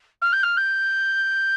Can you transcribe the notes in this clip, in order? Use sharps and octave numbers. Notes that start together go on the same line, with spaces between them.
F6
G6
F6
G6